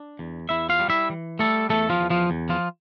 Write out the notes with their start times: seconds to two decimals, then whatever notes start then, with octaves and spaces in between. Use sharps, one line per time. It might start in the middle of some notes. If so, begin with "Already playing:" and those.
Already playing: D4
0.19 E2
0.49 E2 E4 E5
0.69 F4 F5
0.79 G3
0.90 E4 E5
1.10 E3
1.39 G3 A3 A4
1.69 E2 A3 A4
1.90 F3 F4
2.00 E2
2.10 F3 F4
2.30 E2
2.49 F3 F4